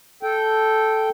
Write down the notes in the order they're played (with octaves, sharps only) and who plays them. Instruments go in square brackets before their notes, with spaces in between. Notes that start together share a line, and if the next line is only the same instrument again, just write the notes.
[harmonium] A4 G5